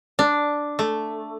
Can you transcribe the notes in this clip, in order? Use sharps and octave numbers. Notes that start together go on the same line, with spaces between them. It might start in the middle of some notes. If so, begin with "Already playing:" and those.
D4
A3